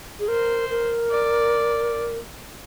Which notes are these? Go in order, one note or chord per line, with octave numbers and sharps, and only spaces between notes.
G#4
A#4 C5
A#4
D5